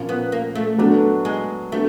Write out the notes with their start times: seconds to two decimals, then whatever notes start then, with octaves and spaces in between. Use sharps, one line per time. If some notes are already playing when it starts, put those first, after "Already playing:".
Already playing: A#2 F3 A#3 C#4
0.09 B3
0.32 A#3
0.55 A3
0.78 F#3 A3 B3 D4 F#4
1.25 G#3
1.72 G3 A3 B3 D4 F#4 A4